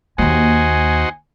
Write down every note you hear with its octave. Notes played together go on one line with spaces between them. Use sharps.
D#2 A#3 D#4 F#4 C5 G#5